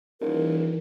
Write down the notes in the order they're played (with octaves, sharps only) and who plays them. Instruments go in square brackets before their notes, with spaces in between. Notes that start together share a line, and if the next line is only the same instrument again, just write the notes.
[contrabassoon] D#1 [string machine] E3 [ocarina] A#4